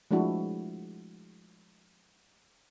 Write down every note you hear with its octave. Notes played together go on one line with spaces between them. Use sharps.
F3 G#3 A3 D4 E4 F#4